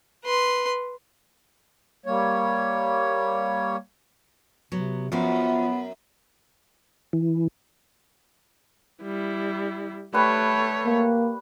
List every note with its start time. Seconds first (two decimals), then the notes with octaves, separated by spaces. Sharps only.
0.25 B4 C6
2.06 G3 A#3 C#5
4.72 C3 F#3 B3
5.12 F#2 F3 B3 F4 F#4
7.13 E3
9.02 G3 E4
10.13 G3 A3 B4 C#5 C#6
10.86 A#3